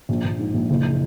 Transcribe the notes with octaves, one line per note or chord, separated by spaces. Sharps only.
A#1
A#1
G#2
A#1
F#1